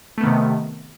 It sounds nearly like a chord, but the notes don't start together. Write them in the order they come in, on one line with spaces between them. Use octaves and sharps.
A3 B3 D#3 C3